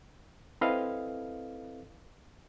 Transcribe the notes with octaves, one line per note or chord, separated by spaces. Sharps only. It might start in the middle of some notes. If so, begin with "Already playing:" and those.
C4 E4 A4 B4 D#5 F5